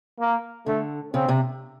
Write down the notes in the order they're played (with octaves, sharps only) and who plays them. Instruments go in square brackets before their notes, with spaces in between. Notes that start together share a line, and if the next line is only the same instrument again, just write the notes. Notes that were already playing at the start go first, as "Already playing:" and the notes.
[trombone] A#3
[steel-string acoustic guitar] D3 [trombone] A3
[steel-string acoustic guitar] C#3 [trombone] C4
[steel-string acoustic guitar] C3